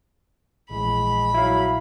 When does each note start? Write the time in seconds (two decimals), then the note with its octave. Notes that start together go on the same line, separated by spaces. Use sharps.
0.70 A#1 E3 G#3 B5
1.34 F#3 E4 F5